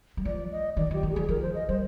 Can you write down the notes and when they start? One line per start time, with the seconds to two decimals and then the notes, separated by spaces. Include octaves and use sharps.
0.17 G3
0.25 F3 D5
0.51 D#5
0.77 D#3 D5
0.91 F3
0.94 G4
1.03 D#3
1.12 F3 G#4
1.28 F3 A#4
1.42 C5
1.54 D#5
1.68 G3 C5